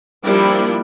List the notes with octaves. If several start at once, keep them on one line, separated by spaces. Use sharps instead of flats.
F3 G3 A#3 D4 E4